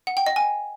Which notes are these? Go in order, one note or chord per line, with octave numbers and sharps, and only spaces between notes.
F#5
G5
D#5
G#5